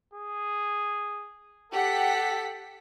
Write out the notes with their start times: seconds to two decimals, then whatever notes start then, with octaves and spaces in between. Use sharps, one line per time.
0.13 G#4
1.72 G4 A4 F#5 B6